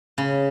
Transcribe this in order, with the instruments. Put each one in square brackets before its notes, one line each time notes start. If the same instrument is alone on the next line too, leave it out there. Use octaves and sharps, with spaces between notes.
[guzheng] C#3